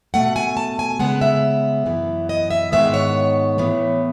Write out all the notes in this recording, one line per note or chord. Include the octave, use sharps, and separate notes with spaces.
B2 A3 F#5
G#5
A5
G#5
C#3 G#3 B3 F#5
E5
F#2 E3 B3
D#5
E5
G#2 D#3 G#3 B3 E5
C#5
A2 E3 B3